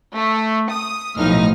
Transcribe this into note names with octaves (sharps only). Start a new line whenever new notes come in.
A3
D#6
B1 A2 F3 D#4 F6